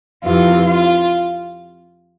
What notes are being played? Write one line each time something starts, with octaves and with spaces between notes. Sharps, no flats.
F2 C3 E3 F4
F4